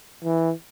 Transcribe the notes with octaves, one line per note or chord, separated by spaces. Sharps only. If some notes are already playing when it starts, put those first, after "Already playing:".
E3